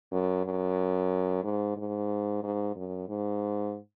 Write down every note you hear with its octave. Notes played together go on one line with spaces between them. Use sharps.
F#2
F#2
G#2
G#2
G#2
F#2
G#2